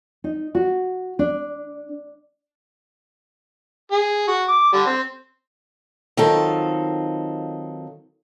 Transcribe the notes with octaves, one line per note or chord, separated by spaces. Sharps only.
D#4
F#4
D4
G#4
F#4
D6
D3 G3
C4
D#3 F#3 C4 F4 A4